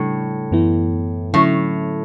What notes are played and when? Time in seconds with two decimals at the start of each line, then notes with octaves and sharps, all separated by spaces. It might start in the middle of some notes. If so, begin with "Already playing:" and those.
Already playing: A2 C#3 G3 D4
0.51 F#2 E3 B3 E4
1.34 A2 D3 F#3 C#4 E4